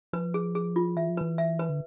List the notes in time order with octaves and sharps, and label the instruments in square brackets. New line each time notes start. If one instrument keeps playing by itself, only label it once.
[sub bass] F3 [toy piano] B4
[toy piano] G#4
G#4
F4
[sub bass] E3 [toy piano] E5
[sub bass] F3
[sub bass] E3 [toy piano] B4
[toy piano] E5
B4
[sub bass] D3